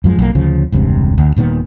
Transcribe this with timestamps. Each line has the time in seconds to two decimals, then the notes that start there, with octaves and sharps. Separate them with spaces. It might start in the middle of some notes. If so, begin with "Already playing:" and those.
0.04 F#2 F3 G#3
0.19 B1 A#3
0.35 D2 C#3 F3
0.72 E1 C#2 G2 C3
1.18 D2
1.36 D#1 A#2 D#3 B3